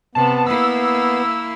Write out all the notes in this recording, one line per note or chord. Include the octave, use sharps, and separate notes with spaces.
C3 B3 A5
A#3 E4 E6